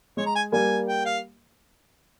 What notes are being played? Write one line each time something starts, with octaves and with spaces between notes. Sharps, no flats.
G#3 C#5
A#5
G#5
G3 A#3 G#5
G5
F5